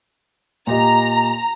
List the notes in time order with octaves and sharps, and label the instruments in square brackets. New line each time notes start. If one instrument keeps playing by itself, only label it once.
[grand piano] A#2 G4 D#5 [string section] A#5